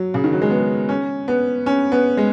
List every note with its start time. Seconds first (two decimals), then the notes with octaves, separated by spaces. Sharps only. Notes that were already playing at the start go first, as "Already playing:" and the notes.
Already playing: F#3
0.14 C#3
0.24 D#3
0.33 F#3
0.41 G#3
0.50 B3
0.89 C#4
1.28 B3
1.66 C#4
1.92 B3
2.17 G#3